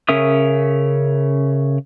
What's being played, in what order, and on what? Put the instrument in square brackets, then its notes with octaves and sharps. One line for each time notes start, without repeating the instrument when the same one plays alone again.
[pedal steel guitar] C#3 C#4 A#4 E5 D#6